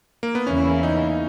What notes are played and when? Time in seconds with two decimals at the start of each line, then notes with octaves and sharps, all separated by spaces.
0.23 A#3
0.35 B3
0.47 E2 C#3 E3 A#3 C#4 E4
0.83 D#4